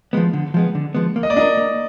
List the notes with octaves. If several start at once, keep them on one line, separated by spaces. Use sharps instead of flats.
F3 G#3 B3
D3
F3 G#3 B3
D3
F3 G#3 B3
A#3
D#5
D5
D4 F4 A#4 D#5
A#3